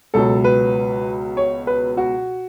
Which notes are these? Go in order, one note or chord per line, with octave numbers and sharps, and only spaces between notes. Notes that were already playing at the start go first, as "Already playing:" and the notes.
C#2 B2 F#3 A4
B4
C#5
B4
F#4